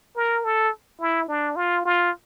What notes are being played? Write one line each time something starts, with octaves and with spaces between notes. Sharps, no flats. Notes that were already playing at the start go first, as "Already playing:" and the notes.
A#4
A4
E4
D4
F4
F4